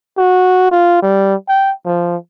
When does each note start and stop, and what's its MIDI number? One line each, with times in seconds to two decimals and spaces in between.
0.17 0.70 66
0.71 0.99 65
1.02 1.35 55
1.48 1.72 79
1.86 2.16 53